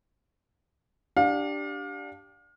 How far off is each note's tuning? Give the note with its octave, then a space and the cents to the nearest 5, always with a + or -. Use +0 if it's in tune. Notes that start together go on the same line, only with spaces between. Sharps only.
D4 +0 G4 +0 F5 +35